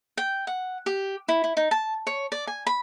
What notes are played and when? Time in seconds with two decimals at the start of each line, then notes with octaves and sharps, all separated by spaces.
0.17 G5
0.47 F#5
0.86 G4
1.28 E4
1.44 E4
1.57 D#4
1.71 A5
2.07 C#5
2.32 D5
2.47 G#5
2.67 B5